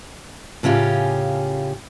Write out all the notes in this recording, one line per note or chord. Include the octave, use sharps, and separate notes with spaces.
A2 C#3 C#4 F4 G4